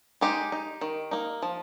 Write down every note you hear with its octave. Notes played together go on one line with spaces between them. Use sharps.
G#3 D#4 G4
D#4
D#3
A#3 D#4
F3